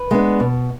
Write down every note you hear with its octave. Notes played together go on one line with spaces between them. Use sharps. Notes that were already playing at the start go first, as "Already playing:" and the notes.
Already playing: B4
G#3 B3 D4
B2